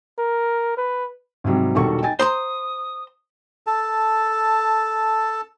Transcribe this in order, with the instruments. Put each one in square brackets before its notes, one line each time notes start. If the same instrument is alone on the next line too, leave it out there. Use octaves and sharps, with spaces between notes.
[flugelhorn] A#4
B4
[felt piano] G#2 C3 F#3 G3
E1 D#3 G3 F#4 A4 C#6
D#4 G5 G#5 A6
[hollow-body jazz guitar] C5 A#5 C6 [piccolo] D#6
[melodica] A4 A5